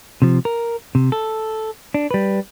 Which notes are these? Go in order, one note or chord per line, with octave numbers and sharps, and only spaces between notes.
C3 F3
A#4
C3
A4
D4
G3 B4